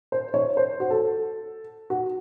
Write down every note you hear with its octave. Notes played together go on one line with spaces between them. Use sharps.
C5
C#5
C5
F#4
A4
F#4